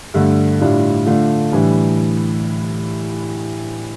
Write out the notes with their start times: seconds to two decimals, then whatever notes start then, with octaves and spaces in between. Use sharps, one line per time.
0.14 G2 D3 A3
0.60 A2 G3 D4 F4
1.06 D3 A3 D4 F4
1.52 A2 E3 G3 D4